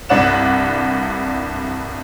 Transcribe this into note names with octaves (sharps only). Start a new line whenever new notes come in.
C2 G2 D5 F#5 E7